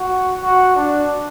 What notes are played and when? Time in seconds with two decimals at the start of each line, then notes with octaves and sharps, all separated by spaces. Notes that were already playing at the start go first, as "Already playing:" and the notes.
Already playing: F#4
0.43 F#4
0.76 D4